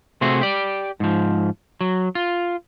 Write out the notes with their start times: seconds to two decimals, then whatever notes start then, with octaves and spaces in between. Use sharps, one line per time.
0.21 C3 A3 C4 F#4 G#4
0.41 G4 D5
1.00 G#2 F3
1.81 F#3
2.15 F4